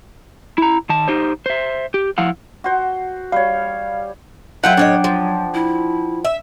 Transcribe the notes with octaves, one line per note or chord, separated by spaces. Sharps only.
E4 A#5
D#3 A5
D#4 G4 C5
C5 E5
G4
F3 E4 F5 F#5
F#4 C5
G3 C#5 F5
F#3 E4 F4 A4 F#5 G5
A2 D4 C#5 D#5
F3
E4
E5